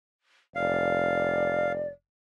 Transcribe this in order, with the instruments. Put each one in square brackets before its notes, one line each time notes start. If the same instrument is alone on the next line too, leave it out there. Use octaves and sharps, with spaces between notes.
[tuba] F1 [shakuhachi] D5 [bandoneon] F5